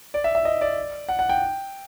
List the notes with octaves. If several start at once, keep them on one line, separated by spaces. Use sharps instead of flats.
D5
E5
E5
D#5
D5
F#5
F#5
G5